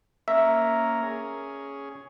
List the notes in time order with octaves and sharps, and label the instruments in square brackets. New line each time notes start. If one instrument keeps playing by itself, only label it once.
[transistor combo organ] A#3 C#4 A#4 [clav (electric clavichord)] E5
[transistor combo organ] C#4 G#4